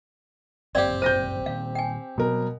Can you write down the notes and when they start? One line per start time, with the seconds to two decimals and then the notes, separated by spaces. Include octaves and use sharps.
0.75 G1 F#2 A#2 C4 G4 D5 F5 G5
1.02 C5 G6 A#6 D#7
1.46 A#2 D#3 A#3 F5
1.75 G5 G#5
2.18 B2 F#3 G3 A#4